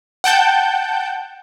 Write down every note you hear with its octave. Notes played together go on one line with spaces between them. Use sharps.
F#5 G5 A5 G6